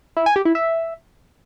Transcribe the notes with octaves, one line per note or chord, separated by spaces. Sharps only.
E4
G#5
G4
E4
E5